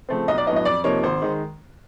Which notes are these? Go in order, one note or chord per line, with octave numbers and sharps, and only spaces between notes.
C#3 F3 A3 C4
B1 D#5
D5
A2 F#3 B3 D4 D#5
D#5
F2 D5
C3 F3 A#3 D#4 C#5
G#1 C5
D#3 G#3